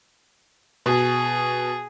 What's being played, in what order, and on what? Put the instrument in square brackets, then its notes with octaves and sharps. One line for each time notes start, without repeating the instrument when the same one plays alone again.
[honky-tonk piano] B2 [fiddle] G#4